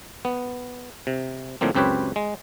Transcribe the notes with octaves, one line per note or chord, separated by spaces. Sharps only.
B3
C3
A2 D3 F3 A#3 C4
C#2 F#2 C4 G4 B4 C#5
G#3